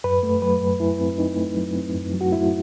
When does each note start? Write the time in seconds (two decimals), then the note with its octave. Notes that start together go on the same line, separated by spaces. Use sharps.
0.04 F#2 B4
0.23 A3
0.42 F#3 B4
0.61 F#2
0.80 F#2 E4
1.00 C4
1.18 C4 D#4
1.37 A3
1.56 F#3
1.75 C4
1.94 F#2
2.13 F#3
2.21 F#4
2.32 A3 E4